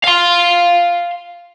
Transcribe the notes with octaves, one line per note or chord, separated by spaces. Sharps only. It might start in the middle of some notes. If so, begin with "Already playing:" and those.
F5 C6